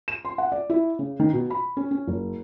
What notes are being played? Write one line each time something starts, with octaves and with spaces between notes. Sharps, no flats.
E7
C6
F#5
D5
E4
C#3
D#3
B2
B5
C#4
C#4
F#1